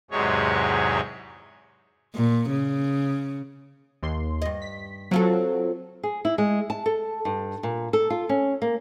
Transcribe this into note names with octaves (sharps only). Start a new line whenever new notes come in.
E2 G#2 C3 F#3 G#3 C#5
A#2
C#3
D#2 C6
G2 D#5
B6
F#3 C4 F4 A4
G#4
E4
G#3
A5
A4
G2
A#2
A4
F4
C#4
A#3